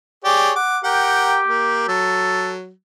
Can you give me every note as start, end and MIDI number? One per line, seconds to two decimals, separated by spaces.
0.25 0.52 67
0.25 0.52 68
0.25 0.52 73
0.25 0.50 74
0.56 0.78 78
0.56 0.78 86
0.84 1.87 67
0.84 1.41 70
0.84 1.41 78
0.84 1.41 79
1.48 1.86 58
1.88 2.71 54
1.88 2.53 69